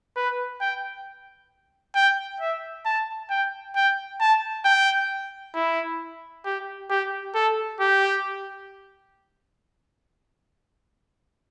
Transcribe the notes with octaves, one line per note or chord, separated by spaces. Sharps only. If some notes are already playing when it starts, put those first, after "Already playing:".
B4
G5
G5
E5
A5
G5
G5
A5
G5
E4
G4
G4
A4
G4